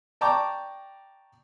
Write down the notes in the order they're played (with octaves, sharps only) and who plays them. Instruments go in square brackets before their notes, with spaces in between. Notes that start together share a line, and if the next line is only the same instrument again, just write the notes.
[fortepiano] D5 G5 A5 A#5 C#6 D6